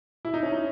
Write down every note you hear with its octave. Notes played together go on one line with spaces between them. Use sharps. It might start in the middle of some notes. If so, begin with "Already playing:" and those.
E4
D#4
C#4
D#4